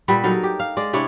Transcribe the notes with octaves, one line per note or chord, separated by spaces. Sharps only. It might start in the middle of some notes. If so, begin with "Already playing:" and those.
A#2 G3 B3 B4
F#3 D#4 A4 A#4
G4
F5
G#3 D5
C3 D4 E4 C#5